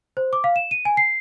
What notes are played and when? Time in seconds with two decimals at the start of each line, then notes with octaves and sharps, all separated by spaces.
0.17 C5
0.33 D6
0.44 F5
0.56 E7
0.71 D#7
0.85 G#5
0.97 C7